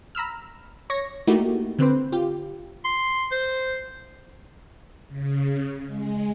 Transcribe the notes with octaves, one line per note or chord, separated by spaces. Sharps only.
A#5 B5 E6 F6
C#5 C#6 A#6
A3 A#3 D#4 E4 F#4 G4
D3 C4 B4 C5
F4 G4
C6
C5
C#3
G#3